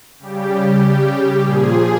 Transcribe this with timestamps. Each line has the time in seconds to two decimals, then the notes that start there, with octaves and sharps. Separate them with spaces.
0.19 C#3 G3 G4
1.42 A#2 F3 G#4